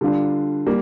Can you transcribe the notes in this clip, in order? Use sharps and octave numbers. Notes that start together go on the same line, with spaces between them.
D3 G3 D4 F4
G3 A#3